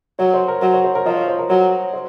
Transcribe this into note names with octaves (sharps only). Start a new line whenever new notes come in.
F#3 C#5
C5
A#4
F#3 C5
C#5
C5
A#4
F3 D#5
C#5
C5
A#4
F#3 C#5
C5